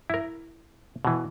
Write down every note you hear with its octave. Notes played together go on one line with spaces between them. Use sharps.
E4 A#4
B2 E3